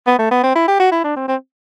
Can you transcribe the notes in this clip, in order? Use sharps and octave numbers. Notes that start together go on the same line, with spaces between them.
B3
A3
B3
C4
E4
G4
F#4
E4
D4
C4
C4